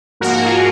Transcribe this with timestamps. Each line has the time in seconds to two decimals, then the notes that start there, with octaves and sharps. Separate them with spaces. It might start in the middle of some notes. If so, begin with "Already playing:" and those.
0.20 G#2 F3 A#3 F#4 A#4
0.45 F4 G#4